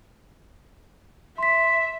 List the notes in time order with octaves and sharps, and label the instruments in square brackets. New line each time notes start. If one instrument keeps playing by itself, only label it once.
[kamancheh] E5 [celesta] C6 B6